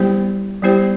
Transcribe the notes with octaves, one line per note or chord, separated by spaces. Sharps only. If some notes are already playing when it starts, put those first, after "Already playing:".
Already playing: G3 B3 E4 G4 C5
G3 B3 E4 G4 C5